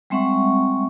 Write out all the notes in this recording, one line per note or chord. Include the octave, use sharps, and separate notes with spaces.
G3 G#3 C4 E5 F#5 C#6